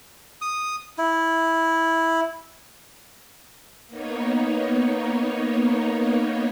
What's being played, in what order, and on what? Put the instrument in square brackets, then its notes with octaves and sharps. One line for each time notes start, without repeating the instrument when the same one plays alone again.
[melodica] D#6
E4
[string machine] A#3 B3 D#4 C#5